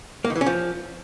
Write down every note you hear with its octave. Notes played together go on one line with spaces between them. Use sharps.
A#3
D#3
E3
C#4
F3